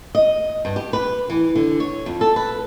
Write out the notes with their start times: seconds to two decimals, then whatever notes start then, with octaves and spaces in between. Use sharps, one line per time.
0.15 D#5
0.65 G2
0.76 G4
0.93 B4
1.30 E3
1.55 D3
1.80 C#5
2.06 F2
2.21 A4
2.36 B4